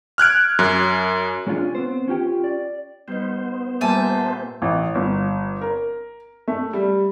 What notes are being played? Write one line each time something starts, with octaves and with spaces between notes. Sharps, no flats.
F6 F#6 G#6 D7
F#2
G#3 C#4 D4 F4 G#4
B3 C4 C5
C#4 F4 G4 G5
D5
G3 B3 D#4 C5
A#2 G3 E5 G#5 A5
A1
G1
A#4
A3
G3